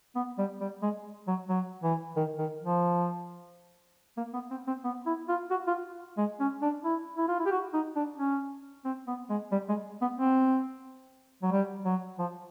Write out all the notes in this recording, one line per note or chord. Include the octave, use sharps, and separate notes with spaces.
B3
G3
G3
G#3
F#3
F#3
E3
D#3
D#3
F3
A#3
B3
C4
C4
B3
E4
F4
F#4
F4
G#3
C#4
D4
E4
E4
F4
E4
G4
F#4
D#4
D4
C#4
C4
B3
G#3
G3
G#3
B3
C4
F#3
G3
F#3
F3